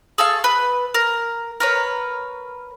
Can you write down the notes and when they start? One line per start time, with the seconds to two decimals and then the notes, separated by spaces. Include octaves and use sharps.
0.18 G#4 A4 F5 C#6
0.44 B4
0.94 A#4
1.60 A#4 B4 C#5